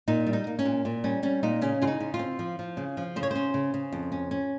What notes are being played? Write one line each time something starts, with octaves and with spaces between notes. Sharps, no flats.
A#2 D#4
G3
D#4
A#3
C#4
A#2
A#2
G3 C#4
G3 C#4
A#2 D#4
C#3 C#4
C#3 F4
D#4
C#3
F4
C4
F3
F3
C#3
F3
C#3 C5
C#5
C#4 C5
C#3
C#3
F2
C#4
C#4